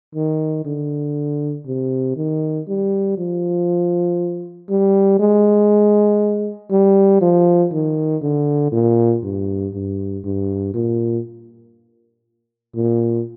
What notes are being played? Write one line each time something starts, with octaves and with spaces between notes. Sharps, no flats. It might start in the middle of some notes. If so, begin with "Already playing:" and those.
D#3
D3
C3
D#3
G3
F3
G3
G#3
G3
F3
D#3
D3
A#2
G2
G2
G2
A#2
A#2